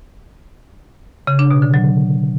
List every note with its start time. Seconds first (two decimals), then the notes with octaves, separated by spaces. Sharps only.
1.27 C#3
1.39 D4
1.51 B2
1.62 D3
1.74 F#3